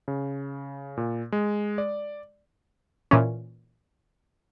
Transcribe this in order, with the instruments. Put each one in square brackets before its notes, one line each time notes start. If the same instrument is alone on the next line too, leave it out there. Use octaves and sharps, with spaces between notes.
[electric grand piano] C#3
A#2
G#3
D5
[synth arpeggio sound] A#2 E3 C#4